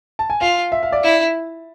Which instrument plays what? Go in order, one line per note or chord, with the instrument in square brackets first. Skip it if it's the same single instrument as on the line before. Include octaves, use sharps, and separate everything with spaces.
[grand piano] A5
G#5
[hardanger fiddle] F4 [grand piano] F5
[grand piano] E5
F5
D5
[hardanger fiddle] E4